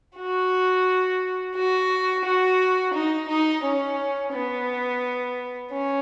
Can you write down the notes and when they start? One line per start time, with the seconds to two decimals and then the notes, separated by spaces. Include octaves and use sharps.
0.17 F#4
1.55 F#4
2.25 F#4
2.94 D#4
3.28 D#4
3.63 C#4
4.32 B3
5.72 C#4